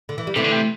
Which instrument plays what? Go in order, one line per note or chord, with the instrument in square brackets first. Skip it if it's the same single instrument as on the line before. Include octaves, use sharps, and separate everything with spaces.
[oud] D3
E3
G3
[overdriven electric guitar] C3 [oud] E3 A3
[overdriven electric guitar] D3
C3